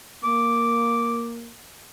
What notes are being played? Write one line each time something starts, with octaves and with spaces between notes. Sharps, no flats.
A#3 D6